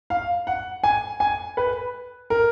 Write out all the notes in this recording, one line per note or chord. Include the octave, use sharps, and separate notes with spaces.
F5
F#5
G#5
G#5
B4
A#4